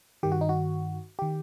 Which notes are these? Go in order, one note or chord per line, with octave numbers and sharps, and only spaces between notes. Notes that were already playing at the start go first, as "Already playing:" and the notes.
G2 D#3 G4
F#4
D#4
F#4
D#3 G4